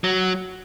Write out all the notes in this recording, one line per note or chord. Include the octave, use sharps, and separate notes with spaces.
F#3